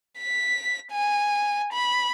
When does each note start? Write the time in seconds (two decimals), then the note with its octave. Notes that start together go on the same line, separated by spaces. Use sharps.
0.18 B6
0.92 G#5
1.73 B5